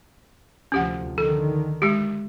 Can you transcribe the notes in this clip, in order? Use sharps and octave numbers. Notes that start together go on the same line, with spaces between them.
D2 C3 F3 C#4 G4 F#5
D3 D#3 A4
G#3 G4